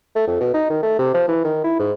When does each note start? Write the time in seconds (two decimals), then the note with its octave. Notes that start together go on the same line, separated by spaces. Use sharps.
0.15 A3
0.27 F2
0.40 B2
0.54 D#4
0.70 D#3
0.83 A3
0.99 C3
1.14 F3
1.28 E3
1.44 D#3
1.64 E4
1.79 G#2